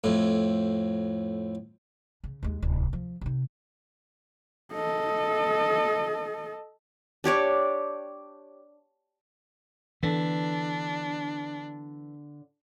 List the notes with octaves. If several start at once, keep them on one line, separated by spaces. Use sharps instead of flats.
F2 A2
C#3
D#2 G#3
D1 C2
F3
C3 D#4
A4 D#5
D4 G4 C#5 D5
D3 E3 B3 D4